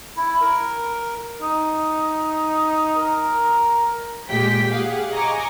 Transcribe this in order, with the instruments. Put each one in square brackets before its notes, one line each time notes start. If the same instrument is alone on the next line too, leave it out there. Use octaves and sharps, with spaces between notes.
[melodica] E4
A#4
[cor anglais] D#4
[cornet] A#4
[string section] A#2 G#3 G4 G5 B6
G4 G#4 F5 F#5
D#5 G#5 A#5 C#6 D6